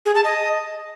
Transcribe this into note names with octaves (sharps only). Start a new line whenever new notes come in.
G#4
A5
D#5